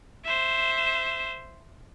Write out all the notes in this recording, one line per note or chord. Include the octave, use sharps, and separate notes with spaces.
C5 E5